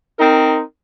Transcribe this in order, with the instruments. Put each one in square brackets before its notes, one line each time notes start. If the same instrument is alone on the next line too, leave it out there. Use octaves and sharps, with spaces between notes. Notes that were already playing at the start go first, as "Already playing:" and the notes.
[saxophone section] C4 D#4 A#4